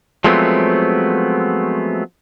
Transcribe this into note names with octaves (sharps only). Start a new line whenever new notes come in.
F3 F#3 G#3 A3 B3 C4